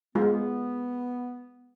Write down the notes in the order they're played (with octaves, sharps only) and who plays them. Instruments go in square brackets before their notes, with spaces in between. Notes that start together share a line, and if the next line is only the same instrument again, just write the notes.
[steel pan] G#3 F4 [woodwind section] B3